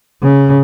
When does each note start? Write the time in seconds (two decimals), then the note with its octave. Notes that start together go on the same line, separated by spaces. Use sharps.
0.23 C#3